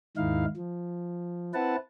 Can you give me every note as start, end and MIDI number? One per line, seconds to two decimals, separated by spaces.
0.17 0.45 39
0.17 0.45 44
0.17 0.45 51
0.17 0.45 63
0.17 0.45 64
0.17 0.45 77
0.57 1.53 53
1.54 1.76 60
1.54 1.76 64
1.54 1.76 71
1.54 1.76 78
1.54 1.76 81